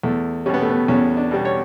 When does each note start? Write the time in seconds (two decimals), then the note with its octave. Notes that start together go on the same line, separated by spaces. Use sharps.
0.03 E2 A3
0.46 B2 G3 C#4
0.54 B3
0.62 A3
0.69 B3
0.88 E2 C#4
1.17 D4
1.31 B2 G3
1.45 C#5